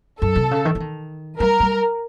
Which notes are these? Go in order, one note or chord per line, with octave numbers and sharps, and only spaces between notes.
F#2 A4
C3
C#3
D#3
E3
D#3
G3 A#4
G3